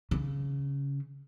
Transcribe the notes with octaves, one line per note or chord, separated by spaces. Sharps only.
C#3